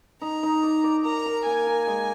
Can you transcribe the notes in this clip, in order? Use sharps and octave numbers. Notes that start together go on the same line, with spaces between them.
D#4 A#5
D#4
D5
D5
A#4 A#5
A#4
A#3 G#5
A#4
G#3